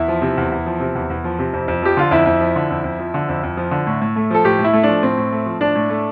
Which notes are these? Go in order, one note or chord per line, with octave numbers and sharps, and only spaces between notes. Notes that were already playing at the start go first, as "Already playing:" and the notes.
Already playing: E2 E4
F3
C3
E2
E2
F3
C3
E2
E2
F3
C3
F2
F2
F3 G4
D3 F4
F2 E4
F2
F3
D3
F2
F2
F3
D3
F2
F2
F3
D3
A2
A2
A3
F3 A4
A2 G4
A2
E4
A3
F3 D4
A2 C4
A2
A3
F3
A2 D4
A2
A3